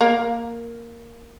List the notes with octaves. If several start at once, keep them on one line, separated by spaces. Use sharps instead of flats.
A#3